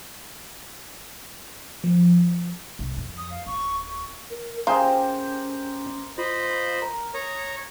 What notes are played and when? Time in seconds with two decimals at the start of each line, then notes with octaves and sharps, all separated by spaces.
1.84 F3
2.79 C2
2.97 F2
3.17 D#6
3.30 F5
3.46 D1 C#6
3.89 C#6
4.30 A#4
4.67 C#4 F4 G4 G#4 A#4 C5 A#5
6.18 F4 C5 D#5 B5
6.82 A#4
7.14 C#5 A#5 D#6